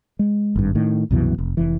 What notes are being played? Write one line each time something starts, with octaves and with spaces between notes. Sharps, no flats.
G#3
G#1 G2
A2 D#3
C2 F#2 B2 E3
F1
F1 E3